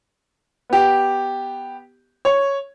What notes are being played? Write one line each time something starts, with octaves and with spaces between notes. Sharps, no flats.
B3 G4
C#5